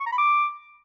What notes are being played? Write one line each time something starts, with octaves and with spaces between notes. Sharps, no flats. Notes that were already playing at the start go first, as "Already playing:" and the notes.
C#6
A#5
B5
D6